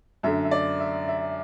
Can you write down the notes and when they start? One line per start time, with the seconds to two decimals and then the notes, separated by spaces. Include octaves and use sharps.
0.23 F#2 D3 A3 E5
0.45 E5
0.51 D5
0.80 E5
1.08 E5